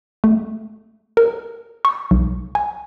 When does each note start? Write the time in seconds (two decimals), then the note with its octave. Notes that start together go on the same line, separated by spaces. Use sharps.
0.24 A3
1.17 A#4
1.85 C#6
2.11 B1
2.55 G#5